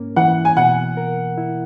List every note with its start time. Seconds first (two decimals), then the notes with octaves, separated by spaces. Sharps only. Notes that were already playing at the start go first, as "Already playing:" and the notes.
Already playing: G#2 A#3 C#4
0.16 E3 F#5
0.45 G#5
0.57 B2 F#5
0.97 A#4
1.38 E4